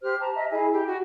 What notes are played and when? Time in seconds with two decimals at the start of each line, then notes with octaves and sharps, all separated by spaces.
0.02 G4 C5 F6
0.20 A5 A#5
0.36 D#5 E5
0.50 E4 G#4 G#5
0.72 G4
0.87 F#4